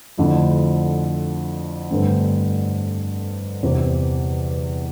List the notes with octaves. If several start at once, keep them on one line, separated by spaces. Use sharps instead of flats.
F2 D3 F3 A3 E4
G2 D3 A3 C4
E2 C3 E3